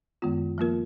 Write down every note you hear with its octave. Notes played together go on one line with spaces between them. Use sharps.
F#2 D#3 G#3 B3 F4
F3 A#3 F4 A#4